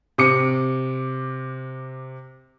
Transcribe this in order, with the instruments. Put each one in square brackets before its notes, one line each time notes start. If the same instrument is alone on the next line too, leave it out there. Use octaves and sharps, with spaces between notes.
[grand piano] C3 D6 C#7